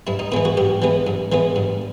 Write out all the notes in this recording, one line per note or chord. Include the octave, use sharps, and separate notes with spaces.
G2 E4
D#4
E3 G#3 B3 E4
F#4
G2 G4
E3 G#3 B3
G2
E3 G#3 B3
G2